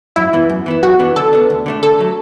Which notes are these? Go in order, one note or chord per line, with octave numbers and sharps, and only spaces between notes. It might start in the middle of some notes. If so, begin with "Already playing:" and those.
F#2 E4
E3 B3
F#2
E3 B3 E4
F#2 F#4
E3 B3 D4
D3 A4
B3 D4
D2
D3 A3 D4
D3 A4
F#3 A3